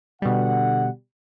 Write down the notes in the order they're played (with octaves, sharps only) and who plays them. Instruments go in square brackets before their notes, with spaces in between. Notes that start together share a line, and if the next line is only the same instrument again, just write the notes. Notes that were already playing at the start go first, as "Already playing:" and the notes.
[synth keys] B2 G3 [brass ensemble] D3 F#5